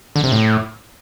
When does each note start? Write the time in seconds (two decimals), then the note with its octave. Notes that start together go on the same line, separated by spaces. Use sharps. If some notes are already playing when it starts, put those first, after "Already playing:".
0.16 D3
0.24 C3
0.32 A2